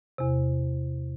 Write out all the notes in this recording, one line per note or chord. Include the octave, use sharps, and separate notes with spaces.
E2 C3